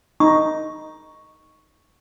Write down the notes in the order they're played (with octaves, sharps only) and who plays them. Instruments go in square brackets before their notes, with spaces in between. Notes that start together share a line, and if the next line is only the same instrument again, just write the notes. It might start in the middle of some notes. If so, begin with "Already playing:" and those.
[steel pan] D#4 [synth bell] C#6